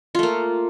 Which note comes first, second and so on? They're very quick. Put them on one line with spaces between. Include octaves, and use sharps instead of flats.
F4 A3 A#3